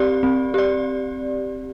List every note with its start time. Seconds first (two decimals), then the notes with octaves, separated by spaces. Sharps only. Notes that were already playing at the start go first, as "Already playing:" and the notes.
Already playing: C4 G4 D5
0.23 C4
0.54 G4 D5